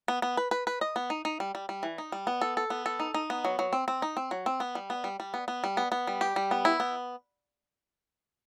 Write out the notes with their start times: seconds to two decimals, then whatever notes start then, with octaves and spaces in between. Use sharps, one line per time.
0.08 B3
0.22 B3
0.37 B4
0.51 B4
0.67 B4
0.81 D#5
0.96 B3
1.10 D#4
1.25 D#4
1.40 G3
1.55 G3
1.69 G3
1.83 E3
1.98 D#4
2.12 G3
2.27 B3
2.41 A4
2.57 A4
2.70 B3
2.86 A4
3.00 D#4
3.14 D#4
3.30 B3
3.45 F#3
3.59 F#3
3.73 C4
3.88 C4
4.02 D#4
4.17 C4
4.31 F#3
4.46 C4
4.60 B3
4.75 G3
4.90 B3
5.04 G3
5.20 G3
5.34 B3
5.48 B3
5.64 G3
5.77 B3
5.92 B3
6.07 G3
6.21 G4
6.36 G3
6.51 B3
6.65 E4
6.80 B3